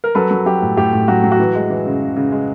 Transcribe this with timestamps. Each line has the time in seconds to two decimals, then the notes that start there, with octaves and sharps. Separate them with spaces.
0.04 A#4
0.15 F#3 A4 B4
0.31 F#3
0.46 F#3 G4
0.62 A2
0.77 A2 G4
0.93 A2
1.08 F#3 F#4
1.24 F#3
1.32 F#4
1.40 E3
1.55 G#3
1.70 E3
1.86 C#3
2.01 C#3
2.17 C#3
2.32 G#3